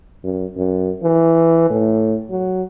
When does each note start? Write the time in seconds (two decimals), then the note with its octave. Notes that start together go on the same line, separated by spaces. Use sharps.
0.24 F#2
0.57 F#2
1.03 E3
1.70 A2
2.30 F#3